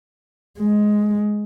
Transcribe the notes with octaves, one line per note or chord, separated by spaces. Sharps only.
G#3